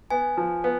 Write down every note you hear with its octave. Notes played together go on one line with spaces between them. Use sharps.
B3 G#5
F3
B3